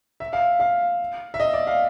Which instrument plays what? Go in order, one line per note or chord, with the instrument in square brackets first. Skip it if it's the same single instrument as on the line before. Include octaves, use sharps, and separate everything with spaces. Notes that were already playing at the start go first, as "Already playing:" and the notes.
[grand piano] E5
F5
F5
E5
D#5
D5
F5